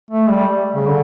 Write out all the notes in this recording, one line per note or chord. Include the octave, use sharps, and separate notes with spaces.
A3
G3
C#3
D3